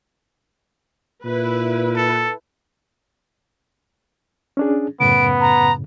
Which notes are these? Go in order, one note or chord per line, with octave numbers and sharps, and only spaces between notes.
A#2 E4 B4
A4
C#4 D4 G#4
F#2 A2 C#3 B3 D7
A#5